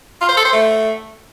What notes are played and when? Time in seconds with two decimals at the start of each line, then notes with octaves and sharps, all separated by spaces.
0.21 F4
0.29 C5
0.37 A4
0.45 C5
0.53 A3